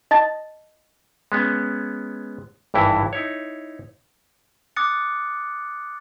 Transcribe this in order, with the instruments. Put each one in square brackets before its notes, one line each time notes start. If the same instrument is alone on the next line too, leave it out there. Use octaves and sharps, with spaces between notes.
[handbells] D#5 A5 A6
[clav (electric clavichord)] G#3 B3 C#4
G#1 G2 E3 E4
D#4 E4 C#5
[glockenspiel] D6 D#6 F#6 A6 C#7